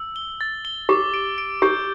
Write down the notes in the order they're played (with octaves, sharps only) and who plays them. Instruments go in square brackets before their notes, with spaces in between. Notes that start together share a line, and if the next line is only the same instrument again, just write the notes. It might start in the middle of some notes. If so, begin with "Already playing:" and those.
Already playing: [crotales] E6
G7
A6
G7
[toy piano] G4 [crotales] D6
[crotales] D7
D7
[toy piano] G4 [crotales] G6